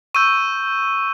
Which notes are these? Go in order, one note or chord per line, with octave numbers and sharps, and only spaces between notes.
C#6 E6 G6 D#7